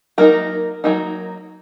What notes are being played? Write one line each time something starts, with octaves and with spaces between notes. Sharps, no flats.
F#3 A#3 D#4 A#4
F#3 A#3 D#4